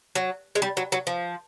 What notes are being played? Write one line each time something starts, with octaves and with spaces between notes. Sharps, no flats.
F#3
G#3
G3
F#3
F#3
F3